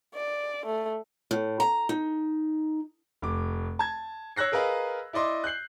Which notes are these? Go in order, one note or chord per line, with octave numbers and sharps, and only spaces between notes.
D5
A3
A2
A#5
D#4
F1 D6
A5 G#6
C#5 E6 F#6 A#6 C7
G#4 A#4 B4 D#5 F5 A#5
E4 D5 D#5 C6 D6
F#6 G6 C7 F#7